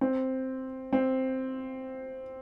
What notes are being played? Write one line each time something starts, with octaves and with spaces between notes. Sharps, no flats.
C4
C4